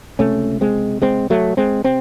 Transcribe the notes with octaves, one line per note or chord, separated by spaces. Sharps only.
C#2 C3 A3 C#4
G#3 C4
G#3 C4
F#3 A3
G#3 C4
C3 C4